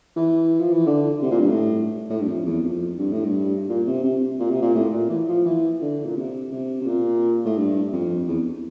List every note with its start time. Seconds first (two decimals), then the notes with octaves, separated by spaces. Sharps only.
0.16 E3
0.60 F3
0.72 E3
0.86 D3
1.22 C3
1.31 A#2
1.40 G2
1.49 A2
2.10 A2
2.20 G2
2.28 F2
2.46 E2
2.63 F2
2.98 G2
3.12 A2
3.24 G2
3.69 A#2
3.87 C3
4.04 C3
4.39 A#2
4.51 C3
4.62 A#2
4.75 A2
4.92 A#2
5.10 E3
5.28 F3
5.45 E3
5.81 D3
6.05 A#2
6.16 C3
6.52 C3
6.81 C3
6.86 A#2
7.45 A2
7.57 G2
7.92 F2
8.28 E2